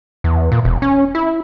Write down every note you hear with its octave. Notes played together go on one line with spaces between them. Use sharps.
E2
A#2
E1
C#4
E4